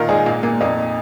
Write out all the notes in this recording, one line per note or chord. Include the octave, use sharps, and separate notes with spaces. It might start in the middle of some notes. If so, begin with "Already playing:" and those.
Already playing: A#2 D#3 F4 A#4
G#2 D#4 G#4
A#2 A#3
A#2 A#3
F2 A#3 D#4